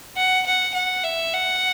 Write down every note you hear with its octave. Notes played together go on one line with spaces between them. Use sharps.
F#5
F#5
F#5
E5
F#5